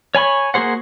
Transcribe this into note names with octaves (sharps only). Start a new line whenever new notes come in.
C#5 G#5 B5 C#6
A#3 F#4 G#4 C5 F#5